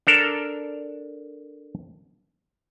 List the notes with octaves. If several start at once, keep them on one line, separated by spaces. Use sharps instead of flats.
D4 A4 A#4